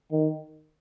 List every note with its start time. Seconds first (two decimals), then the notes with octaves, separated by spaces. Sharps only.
0.12 D#3